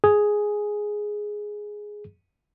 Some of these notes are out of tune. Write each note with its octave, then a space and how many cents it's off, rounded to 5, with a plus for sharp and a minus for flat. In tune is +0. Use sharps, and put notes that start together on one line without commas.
G#4 +5